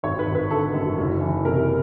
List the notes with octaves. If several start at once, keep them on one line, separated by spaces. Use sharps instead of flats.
G#1 C#5
B4
G#1
B4
D3 A4
F#2
F#1
E3
C3 A#4